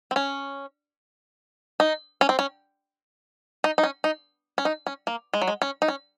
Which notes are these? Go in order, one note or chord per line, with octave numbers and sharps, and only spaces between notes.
C4
C#4
D#4
C#4
C4
C#4
D#4
D#4
C#4
D#4
C#4
D#4
C#4
A#3
G#3
F#3
G#3
C#4
D#4
C#4